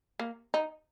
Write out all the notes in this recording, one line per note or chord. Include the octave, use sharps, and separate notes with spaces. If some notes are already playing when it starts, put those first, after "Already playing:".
A#3
D#4